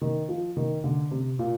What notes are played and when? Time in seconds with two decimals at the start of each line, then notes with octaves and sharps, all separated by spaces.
0.01 D#3
0.29 F3
0.57 D#3
0.84 D3
1.11 C3
1.39 A#2